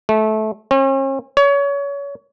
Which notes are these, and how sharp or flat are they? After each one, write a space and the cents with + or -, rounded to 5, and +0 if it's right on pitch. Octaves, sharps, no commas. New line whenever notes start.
A3 -20
C#4 -45
C#5 +25